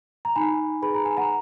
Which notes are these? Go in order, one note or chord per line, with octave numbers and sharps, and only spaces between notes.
A#5
D#4 G#5 B5
G#4 B4 B5
A#5
G#5
F#5 A#5